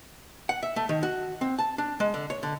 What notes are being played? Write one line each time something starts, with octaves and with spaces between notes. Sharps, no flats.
F#5
E5
A3
D#3
F#4
C4
A5
D4
G#3
D3
C#5
D3